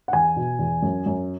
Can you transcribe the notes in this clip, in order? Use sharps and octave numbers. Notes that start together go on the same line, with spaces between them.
F#5
E2 G#5
B2
E2
F#2
F#2